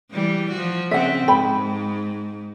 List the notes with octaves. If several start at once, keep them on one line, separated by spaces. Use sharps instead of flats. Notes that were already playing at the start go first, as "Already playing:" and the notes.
E3 G3
F3 F#4
C#3 C4 E5 F#5
G#2 G5 B5